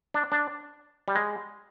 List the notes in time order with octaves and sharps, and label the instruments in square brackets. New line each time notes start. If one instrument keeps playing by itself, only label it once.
[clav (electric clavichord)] D4
D4
G3
G#3